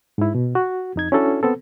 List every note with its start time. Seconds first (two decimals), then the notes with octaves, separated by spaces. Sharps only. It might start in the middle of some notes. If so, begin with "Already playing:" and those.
0.18 G#2 E4
0.35 B2
0.55 F#4
0.96 F2 D#4 G#6
1.12 C#4 D4 E4 F#4 A4
1.43 B3 C4 A4